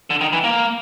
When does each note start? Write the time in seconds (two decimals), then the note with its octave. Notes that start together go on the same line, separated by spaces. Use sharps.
0.10 D3
0.21 D#3
0.33 E3
0.44 A#3